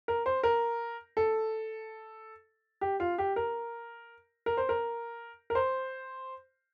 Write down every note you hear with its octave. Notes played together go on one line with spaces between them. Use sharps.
A#4
C5
A#4
A4
G4
F4
G4
A#4
A#4
C5
A#4
A#4
C5